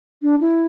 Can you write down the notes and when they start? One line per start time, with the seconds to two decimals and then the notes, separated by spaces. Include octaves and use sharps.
0.22 D4
0.41 E4